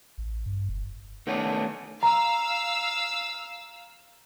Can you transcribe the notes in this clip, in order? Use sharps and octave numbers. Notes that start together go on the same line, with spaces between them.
A1
G2
F#1
D#3 A3 B3 C#4 D4
F5 A#5 E6